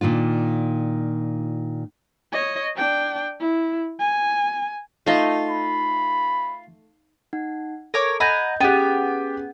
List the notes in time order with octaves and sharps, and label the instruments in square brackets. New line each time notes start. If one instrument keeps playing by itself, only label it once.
[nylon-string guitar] A#2 D#3 D4 F4
[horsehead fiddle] C#5 D#5
D4 G5
E4
G#5
[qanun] A3 D#4 D#5 [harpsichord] F4
[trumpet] B5
[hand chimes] D#4 F#5
[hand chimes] A4 [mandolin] A#4 C#5 D6
[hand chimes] D#5 G6 [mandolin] F#5 G#5 A#5 [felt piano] B5
[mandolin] B3 [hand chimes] C#4 G#4 [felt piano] G4 G5